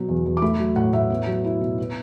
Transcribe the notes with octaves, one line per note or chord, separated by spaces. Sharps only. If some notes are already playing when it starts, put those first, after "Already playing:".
Already playing: B2 F#3
E2
E2
D6
A3 B5
F#3
A2 F#5
A2 E5
B3
F#3
E4
B2
B3